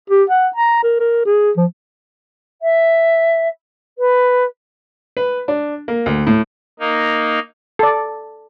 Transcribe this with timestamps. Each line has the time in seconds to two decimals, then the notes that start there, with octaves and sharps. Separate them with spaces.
0.10 G4
0.30 F#5
0.56 A#5
0.83 A#4
1.00 A#4
1.26 G#4
1.57 F3
2.62 E5
3.98 B4
5.17 B4
5.48 D4
5.88 A#3
6.06 D2
6.27 A2
6.80 A#3 D#4
7.79 A4 D5